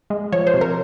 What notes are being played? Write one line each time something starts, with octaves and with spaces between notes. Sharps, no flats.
G#3
F3 C#5
C5
C3
A#4